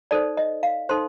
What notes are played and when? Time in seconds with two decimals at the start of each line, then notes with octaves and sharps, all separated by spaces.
0.11 D#4 A4 C5 D5
0.37 D#5
0.63 F5
0.89 D#4 A4 C5 C6